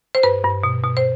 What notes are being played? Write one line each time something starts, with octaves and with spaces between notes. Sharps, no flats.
C5
G2 B4
G2
B2
B2
C5